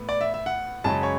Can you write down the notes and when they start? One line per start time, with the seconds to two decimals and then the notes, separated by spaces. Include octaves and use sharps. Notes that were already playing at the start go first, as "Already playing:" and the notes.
Already playing: A2 B3
0.09 D5
0.21 E5
0.34 E5
0.46 F#5
0.84 F#2 C#3 G#3 C#4 A5
1.03 C#5